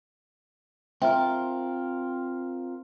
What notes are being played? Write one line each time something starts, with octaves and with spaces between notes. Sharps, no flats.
C4 F4 A#4 E5 G5